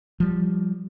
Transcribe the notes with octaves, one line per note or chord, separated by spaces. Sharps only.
F3 G3